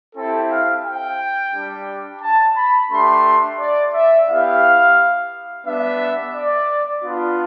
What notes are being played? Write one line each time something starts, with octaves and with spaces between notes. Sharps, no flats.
C4 E4 G4 A4
F5
G5
G3 D4 G4
A5
B5
A3 D4 G4 C6
D5
E5
B3 E4 G4 F5
G3 B3 D4 E5
D5
B3 D4 F4